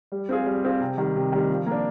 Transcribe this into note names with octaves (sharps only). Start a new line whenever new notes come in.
G3
C4 F4 G#4
G3
C4 F4 G#4
C3
D#3 G3
C3
D#3 G3
F3
A#3 D4